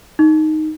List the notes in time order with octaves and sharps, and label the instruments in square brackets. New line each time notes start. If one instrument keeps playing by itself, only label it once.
[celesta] D#4